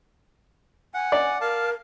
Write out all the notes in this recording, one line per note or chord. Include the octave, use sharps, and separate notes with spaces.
F#5 G#5
D5
A#4 F5 A5